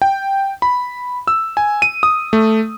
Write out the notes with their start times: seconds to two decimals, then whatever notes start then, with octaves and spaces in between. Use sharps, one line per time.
0.02 G5
0.62 B5
1.27 E6
1.57 G#5
1.82 D#7
2.03 D#6
2.33 A3